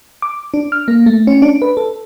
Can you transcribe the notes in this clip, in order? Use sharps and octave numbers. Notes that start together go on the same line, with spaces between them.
D6
D4
F6
A#3
A3
C#4
D4
B4
A4